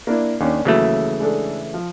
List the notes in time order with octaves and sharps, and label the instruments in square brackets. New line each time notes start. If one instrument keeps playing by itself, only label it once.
[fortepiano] A#3 D4 E4
[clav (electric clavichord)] D#2 [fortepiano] A#3 C#4 D4
[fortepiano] D#2 F#3 [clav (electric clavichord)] C#3 E3 A3
[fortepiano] G#3 D4 A4
F3